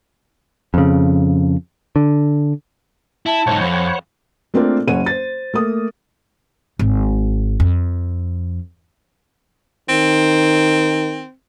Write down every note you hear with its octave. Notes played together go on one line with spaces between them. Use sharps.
F2 C#3
D3
E4 A5
B1 G#2 C5 C#5 F#5
F2 B5
A3 A#3 C4 D4 F4 A#4
F#1 C#4 C#5 F#5 D#7
C5 A6
A3 A#3 D#6
G#1
F2
D#3 C4